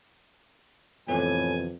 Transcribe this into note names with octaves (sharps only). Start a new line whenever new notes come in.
F2 A2 C3 E3 B3 G#5